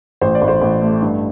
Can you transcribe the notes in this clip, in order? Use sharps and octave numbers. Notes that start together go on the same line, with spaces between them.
A1 C5
D5
A1
C5
A1
A3
G2